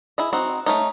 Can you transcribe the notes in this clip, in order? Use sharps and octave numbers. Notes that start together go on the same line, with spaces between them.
E4 G#4 D#5
C4 D#4 F#4
A3 C#4 D#4